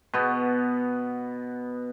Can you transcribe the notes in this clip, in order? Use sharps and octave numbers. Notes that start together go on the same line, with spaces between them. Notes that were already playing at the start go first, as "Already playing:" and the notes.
B2 B3